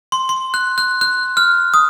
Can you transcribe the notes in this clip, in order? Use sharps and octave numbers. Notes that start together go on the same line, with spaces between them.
C6
C6
F#6
F#6
F#6
F6
D#6